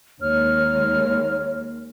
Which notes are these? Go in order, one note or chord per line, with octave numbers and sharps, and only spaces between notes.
D#2 G#3 C#5 F6